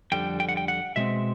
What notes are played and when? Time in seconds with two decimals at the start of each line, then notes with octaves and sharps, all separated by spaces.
0.12 F2 D3 G3 G5
0.40 G5
0.49 F#5
0.57 G5
0.68 F#5
0.96 B2 G#3 C4 E5